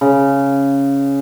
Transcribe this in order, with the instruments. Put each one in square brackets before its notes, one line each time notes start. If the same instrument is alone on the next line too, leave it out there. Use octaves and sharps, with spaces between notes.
[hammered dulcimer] C#3